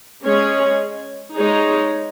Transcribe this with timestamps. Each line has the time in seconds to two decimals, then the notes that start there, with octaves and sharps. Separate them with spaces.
0.25 G#3 C#4 G#4 C#5
1.36 G#3 D#4 G#4 C#5